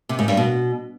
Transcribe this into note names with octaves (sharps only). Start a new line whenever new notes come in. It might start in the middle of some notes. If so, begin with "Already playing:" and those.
C3
G#2
G2
B2